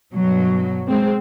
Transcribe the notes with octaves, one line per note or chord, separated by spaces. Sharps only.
G2 B2 F#3
G#3 C4